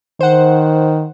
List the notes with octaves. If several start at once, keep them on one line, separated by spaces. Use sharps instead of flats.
D#3 C5 F#5